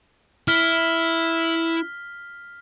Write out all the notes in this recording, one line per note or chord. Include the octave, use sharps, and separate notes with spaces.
E4 F6 B6 G7